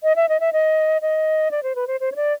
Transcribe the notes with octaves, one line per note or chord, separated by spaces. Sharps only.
D#5
E5
D#5
E5
D#5
D#5
D5
C5
B4
C5
C5
C#5
D5